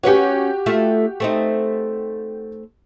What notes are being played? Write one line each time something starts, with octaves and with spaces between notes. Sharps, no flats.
C#4 F#4 G4 B4 C#5
A3 F4
A3 C4 D#4